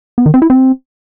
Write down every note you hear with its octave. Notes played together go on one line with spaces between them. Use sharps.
B3
D#3
C4
E4
C4